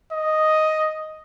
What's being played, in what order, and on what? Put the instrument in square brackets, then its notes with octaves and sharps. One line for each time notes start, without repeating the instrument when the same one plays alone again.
[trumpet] D#5